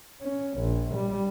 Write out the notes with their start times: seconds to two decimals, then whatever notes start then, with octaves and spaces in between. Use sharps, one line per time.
0.22 C#4
0.58 A#1
0.95 G3